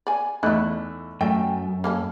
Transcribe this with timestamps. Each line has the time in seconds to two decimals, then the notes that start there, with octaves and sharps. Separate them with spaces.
0.07 D5 G#5
0.43 E2 A3 D#4 E4 F#6
1.21 F#2 A3 G5
1.84 A#3 C#4 A4